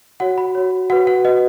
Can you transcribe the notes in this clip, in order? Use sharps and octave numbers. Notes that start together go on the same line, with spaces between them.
F#4 C#5 F#5
B5
F#4 C#5
F#4 B4 F#5
F#5
F#4 B4 D#5